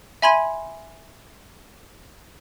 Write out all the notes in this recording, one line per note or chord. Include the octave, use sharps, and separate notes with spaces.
E5 G#5 B5 C6 G#6 D#7